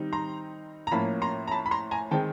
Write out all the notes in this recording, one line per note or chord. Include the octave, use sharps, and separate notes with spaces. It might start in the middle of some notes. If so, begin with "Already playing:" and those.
Already playing: D#3 G3 C4 D#4
A#5 C6
A#5
A2 F3 A#3 C#4 A5 B5
A#5 C6
A#5
A5 B5
B5
A#5 C6
G#5 A#5
D#3 G#3 C4 D#4 G5 A5